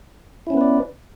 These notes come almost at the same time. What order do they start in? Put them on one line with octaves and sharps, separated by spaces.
E4 C#4 B3 B4 D5